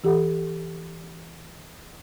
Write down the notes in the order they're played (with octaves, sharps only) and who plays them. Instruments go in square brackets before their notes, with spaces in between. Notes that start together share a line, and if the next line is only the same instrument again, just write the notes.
[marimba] E3 G4 A4 F#5